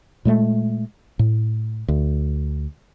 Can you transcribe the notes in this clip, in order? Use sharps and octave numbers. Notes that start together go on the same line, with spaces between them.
A#2 G#3 A3
A2
D2